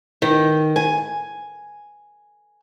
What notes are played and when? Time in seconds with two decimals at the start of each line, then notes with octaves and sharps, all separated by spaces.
0.22 D#3
0.76 G#5